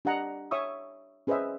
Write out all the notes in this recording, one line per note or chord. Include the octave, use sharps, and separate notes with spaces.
D4 G4 D#5 F#5 A#5
C#5 E5 C#6 D#6 E6
C#4 G#4 B4 C5 D#5 E5